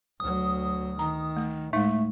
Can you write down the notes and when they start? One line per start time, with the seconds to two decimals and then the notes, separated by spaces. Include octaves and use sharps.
0.20 D2 F#3 D#6
0.99 D#3 A#5
1.37 A3
1.73 A2 G#3 A3 D#4